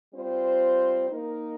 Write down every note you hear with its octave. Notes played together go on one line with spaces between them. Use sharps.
G3 C4 F4 C5
A#3 D#4 A#4